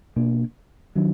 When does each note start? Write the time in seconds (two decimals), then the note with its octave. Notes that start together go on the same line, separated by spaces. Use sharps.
0.16 B2 A#3 D4
0.95 D#3 F#3 D4